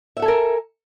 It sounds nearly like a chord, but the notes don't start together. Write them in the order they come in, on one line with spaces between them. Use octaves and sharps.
E5 F#5 A4 G#5 A#4